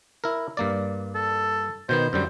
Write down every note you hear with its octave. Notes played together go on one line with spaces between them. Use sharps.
E4 A#4
G2 A#3 D5
A4
B2 D#3 B3 C5
F#2 D3 G3 C5